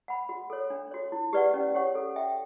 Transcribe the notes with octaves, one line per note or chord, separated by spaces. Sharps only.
F#5 B5
F#4
A4 C#5
D4
F#4 C#5
E4
G4 B4 D5 F#5
C#4
G4 C#5 F#5 C#6
A4
E5 G5